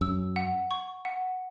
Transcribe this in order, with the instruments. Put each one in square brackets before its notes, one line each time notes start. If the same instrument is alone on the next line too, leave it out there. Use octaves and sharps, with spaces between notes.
[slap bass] F#2 [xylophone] E6
[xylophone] F#5
C#6
F#5